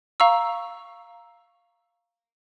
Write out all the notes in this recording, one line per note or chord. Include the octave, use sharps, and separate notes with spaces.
F5 A#5 C#6 E6